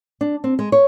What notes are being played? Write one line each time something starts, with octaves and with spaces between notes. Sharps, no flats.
D4
C4
G#3
C#5